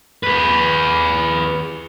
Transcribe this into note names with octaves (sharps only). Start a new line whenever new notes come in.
G#4 B4